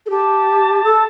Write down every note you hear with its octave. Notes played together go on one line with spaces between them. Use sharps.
A4
G4 A5
A4